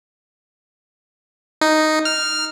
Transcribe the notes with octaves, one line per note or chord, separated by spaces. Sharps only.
D#4
F6